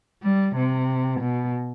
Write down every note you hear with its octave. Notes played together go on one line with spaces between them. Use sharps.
G3
C3
B2